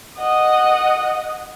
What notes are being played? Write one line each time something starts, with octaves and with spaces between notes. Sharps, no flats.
D#5 F#5